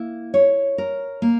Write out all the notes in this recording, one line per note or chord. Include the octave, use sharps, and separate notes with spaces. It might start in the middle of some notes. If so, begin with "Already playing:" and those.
Already playing: A#3 E4
C#5
A#4
A#3